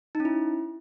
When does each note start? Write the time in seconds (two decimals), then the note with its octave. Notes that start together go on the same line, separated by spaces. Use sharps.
0.15 D#4
0.20 C#4
0.25 E4